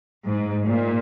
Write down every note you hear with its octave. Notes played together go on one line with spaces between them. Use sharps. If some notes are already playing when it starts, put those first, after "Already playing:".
G#2
A#2